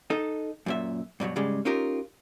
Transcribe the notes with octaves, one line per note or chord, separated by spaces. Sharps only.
D#4 A4 D#5
F#2 A#2 E5
G2 B2 E3 F#3
G#2 C#3 G3 G#3
C#4 D#4 F4 G4 A#4